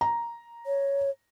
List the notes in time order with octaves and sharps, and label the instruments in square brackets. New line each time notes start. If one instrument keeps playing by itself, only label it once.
[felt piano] A#5
[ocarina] C#5